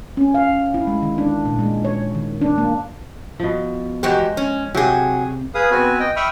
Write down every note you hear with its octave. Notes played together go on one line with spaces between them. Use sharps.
C#4
F5
E4
G#3
D#3
D4
A#2
G#3
C#5
D#3
D4
A#3
B2 F3
E2 G#3 F#4 G4 C5
C#4
C3 F#3 G4 G#4 G5
G#4 B4 F5 D#6
B3 C4 F#4 B4 G#5
D#5 G5
E5 G5 B5 C#6 D#6 F6